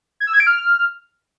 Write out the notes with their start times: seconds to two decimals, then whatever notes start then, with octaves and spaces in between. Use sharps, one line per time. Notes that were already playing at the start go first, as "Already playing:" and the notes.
0.20 G#6
0.27 E6
0.33 G#6
0.40 D7
0.47 F6